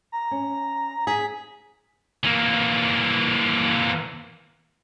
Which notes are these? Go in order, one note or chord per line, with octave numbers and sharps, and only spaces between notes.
A#5
C#4
G#4 B6
E3 A#3